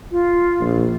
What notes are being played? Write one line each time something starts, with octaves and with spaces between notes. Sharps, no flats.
F4
A#1